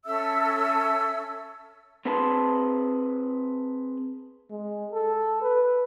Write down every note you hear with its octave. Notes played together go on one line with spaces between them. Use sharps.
C#4 A4 E5 E6
C4 G#4 B4 A5 B5 C6
G#3
A4
B4